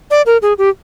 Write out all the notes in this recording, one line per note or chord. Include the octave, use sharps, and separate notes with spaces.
D5
A#4
G#4
G4